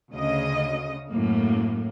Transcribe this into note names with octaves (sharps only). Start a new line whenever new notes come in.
D2 C#3 D#5
F#2 A2 A#3